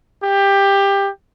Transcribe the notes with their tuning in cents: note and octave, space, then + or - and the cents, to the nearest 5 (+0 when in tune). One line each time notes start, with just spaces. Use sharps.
G4 +15